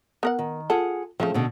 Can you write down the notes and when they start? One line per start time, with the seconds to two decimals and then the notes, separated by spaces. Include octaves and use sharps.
0.23 B3 A#4 F#5
0.39 D#3
0.70 F4 G#4 A4 F#5
1.20 C#3 F3 A3 C4
1.34 B2 D3